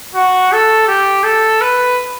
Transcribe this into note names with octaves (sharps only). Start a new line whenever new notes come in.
F#4
A4
G4
A4
B4